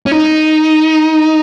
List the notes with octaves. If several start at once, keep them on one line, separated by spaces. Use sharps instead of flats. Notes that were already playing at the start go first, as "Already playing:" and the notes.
C#4
D#4